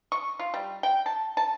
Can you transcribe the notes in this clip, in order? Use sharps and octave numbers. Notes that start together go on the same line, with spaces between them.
C#6
F4
G3
G5
A5
A5